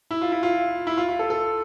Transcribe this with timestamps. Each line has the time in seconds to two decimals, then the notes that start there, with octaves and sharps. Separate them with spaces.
0.11 E4
0.21 F4
0.32 E4
0.43 F4
0.87 E4
0.98 F4
1.09 F4
1.19 A4
1.30 A4